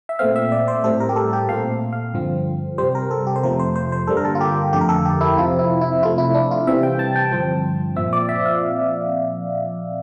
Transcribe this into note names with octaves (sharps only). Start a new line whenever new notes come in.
E5
A#2 A3 C4 F5
E5
D5
C5
A2 G3 C4 A4
A#4
G4
A4
G4
A#2 A3 C4 F5
F5
G2 D3 F3 C4
C3 G3 C4 C5
A#4
A4
G4
C5
F2 C3 F3 A3 A#4
C5
C5
C5
G2 D3 G3 A#3 A4
A#4
A4
F4
G4
F2 D3 A3 G4
A#4
A4
G4
E4
F2 C3 F3 C4 F4
E4
E4
C3 F3 A3 F4
E4
D4
F4
C3 E3 G3 C4 E5
G5
A5
G5
G2 D3 F3 C4
A#2 F3 C4 E5
D5
E5
F5